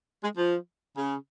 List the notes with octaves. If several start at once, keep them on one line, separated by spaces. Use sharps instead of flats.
G#3
F3
C#3